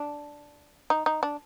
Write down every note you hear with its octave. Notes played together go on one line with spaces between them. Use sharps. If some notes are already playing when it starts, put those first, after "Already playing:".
Already playing: D4
D#4
D#4
D4